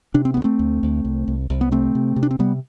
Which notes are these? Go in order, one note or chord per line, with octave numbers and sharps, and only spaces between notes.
C3 D4
C4
D2 B3
A3 C4
D2
D2
C2
C2
C2
B3
C3 A3 C4
C3
C3
D4
C4
C3 G3 B3